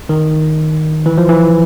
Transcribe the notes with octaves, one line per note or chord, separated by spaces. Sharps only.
D#3
E3
F3
E3